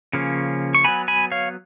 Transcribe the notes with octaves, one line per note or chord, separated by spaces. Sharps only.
C#3 F3 A#3 C#4
C#6
F#3 B3 G#5 B5
G#5 B5
C#5 F5